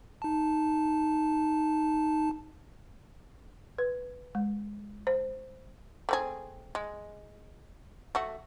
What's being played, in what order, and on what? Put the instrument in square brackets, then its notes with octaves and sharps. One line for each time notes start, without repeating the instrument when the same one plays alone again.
[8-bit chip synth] D#4 A5
[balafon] B4
G#3
C5
[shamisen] A3 C4 G#4
G#3
A3 F#4